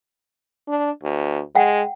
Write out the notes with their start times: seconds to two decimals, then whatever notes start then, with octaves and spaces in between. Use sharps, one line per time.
0.68 D4
1.03 D2
1.55 G#3 F#5 G5